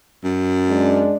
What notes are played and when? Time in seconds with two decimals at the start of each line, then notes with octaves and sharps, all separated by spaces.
0.24 F#2
0.69 G#3 D4